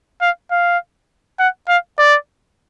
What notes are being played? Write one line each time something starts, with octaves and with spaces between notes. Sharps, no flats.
F5
F5
F#5
F5
D5